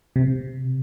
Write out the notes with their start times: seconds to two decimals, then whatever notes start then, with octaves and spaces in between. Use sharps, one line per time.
0.16 C3